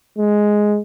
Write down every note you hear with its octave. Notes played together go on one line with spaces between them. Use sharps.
G#3